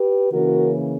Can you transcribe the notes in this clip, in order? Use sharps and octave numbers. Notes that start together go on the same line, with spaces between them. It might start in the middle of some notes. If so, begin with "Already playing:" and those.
Already playing: G4 B4
C#3 E3 A#3 C#4 F#4 A#4